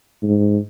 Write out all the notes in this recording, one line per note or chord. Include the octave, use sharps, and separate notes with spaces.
G#2